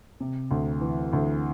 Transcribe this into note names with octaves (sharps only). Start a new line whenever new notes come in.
C3
D2
E3
D2